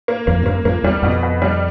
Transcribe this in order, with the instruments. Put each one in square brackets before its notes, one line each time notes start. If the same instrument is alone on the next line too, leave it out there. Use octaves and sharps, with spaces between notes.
[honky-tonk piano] A#3
[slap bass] F2 [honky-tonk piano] A#3
[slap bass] G2
[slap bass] F#2 [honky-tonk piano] A#3
[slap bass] F2 [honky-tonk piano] A#3
[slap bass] E2 [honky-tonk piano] G3
[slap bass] F2 [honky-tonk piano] B2
[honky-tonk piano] B2
G3